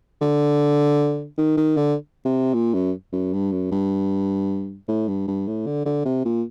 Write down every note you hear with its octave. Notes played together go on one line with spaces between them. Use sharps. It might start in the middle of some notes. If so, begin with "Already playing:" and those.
D3
D#3
D#3
D3
C3
A#2
F#2
F#2
G2
F#2
G2
A2
G2
G2
A2
D3
D3
C3
A#2